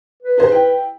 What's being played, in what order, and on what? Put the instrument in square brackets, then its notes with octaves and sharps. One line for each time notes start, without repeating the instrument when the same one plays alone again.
[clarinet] B4
[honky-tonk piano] D#4 G#4 C5
E4 G5